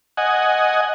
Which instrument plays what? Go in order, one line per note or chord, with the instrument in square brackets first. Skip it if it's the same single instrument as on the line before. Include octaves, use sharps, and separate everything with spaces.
[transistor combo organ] D#5 F#5 G#5